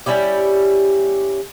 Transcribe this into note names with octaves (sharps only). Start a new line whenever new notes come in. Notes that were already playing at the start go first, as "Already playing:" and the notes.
G3 C#4 E4 G4